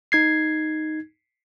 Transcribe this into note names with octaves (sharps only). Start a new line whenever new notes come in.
D#4 G#6 C7